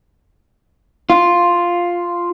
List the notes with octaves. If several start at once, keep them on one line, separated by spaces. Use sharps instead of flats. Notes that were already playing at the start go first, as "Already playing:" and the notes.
F4